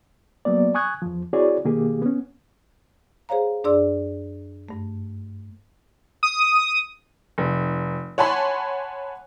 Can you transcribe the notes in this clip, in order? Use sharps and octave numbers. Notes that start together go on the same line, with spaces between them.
F#3 A#3 B3 D5
G#5 C#6 D#6 F#6 G#6
E2 F3
C4 E4 F#4 G#4 C#5 D5
B2 D#3 A#3 G4 G#4
B3 C#4
G#4 C5 C#5 F5 A#5
F#2 D4 G#4 D5 C6 E6
G2 A3
D#6
F1
C#5 F#5 G#5 A5 B5 C6